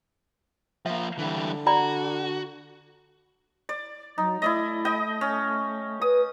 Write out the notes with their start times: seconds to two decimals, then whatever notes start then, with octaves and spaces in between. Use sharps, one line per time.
0.86 F3 A#3 E5
1.19 D3 E3 G3
1.67 F#4 D5 A#5 B5
3.69 D5
4.18 F#3 D#4
4.42 A3 E4 D5 D#5
4.85 D#5 G5 D#6
5.21 C#4
6.02 B4 D#6